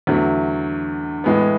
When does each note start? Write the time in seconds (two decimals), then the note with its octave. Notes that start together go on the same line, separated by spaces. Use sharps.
0.07 E2 D3 F#3 A3
1.24 A2 E3 G#3 B3